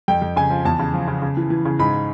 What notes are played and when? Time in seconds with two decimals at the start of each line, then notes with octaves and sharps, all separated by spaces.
0.08 F2 G5
0.22 F2
0.36 C#3 G#5
0.50 F3
0.65 E2 A5
0.79 C#3
0.93 F3
1.08 C#3
1.22 C#3
1.37 E3
1.50 E3
1.65 C#3
1.79 G#2 B5